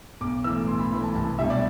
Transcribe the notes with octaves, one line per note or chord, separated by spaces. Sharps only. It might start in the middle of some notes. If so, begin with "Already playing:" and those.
B1 D6
A2 E3 E6
B1 C6
B5
A2 E3 B5
A5
C2 A5
B2 G3 E5
D5